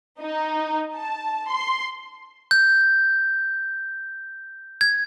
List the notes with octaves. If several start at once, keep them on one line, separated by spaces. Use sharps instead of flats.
D#4
A5
C6
G6
G#6